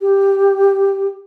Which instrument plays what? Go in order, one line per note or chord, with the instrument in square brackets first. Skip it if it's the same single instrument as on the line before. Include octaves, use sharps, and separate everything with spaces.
[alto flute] G4